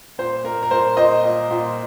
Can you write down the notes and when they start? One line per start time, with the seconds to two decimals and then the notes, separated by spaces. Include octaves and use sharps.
0.19 A#2 C5
0.44 A#2 A#4
0.63 A#4
0.71 A#2 C5
0.97 A#2 C5 D#5
1.24 A#2
1.51 A#2